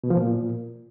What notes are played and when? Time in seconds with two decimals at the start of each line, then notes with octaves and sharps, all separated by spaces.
0.04 B2
0.10 F3
0.17 A#2